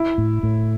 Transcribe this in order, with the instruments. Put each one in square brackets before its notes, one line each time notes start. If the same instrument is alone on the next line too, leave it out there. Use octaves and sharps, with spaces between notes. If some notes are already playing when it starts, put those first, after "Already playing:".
Already playing: [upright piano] E4
[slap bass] A2
A2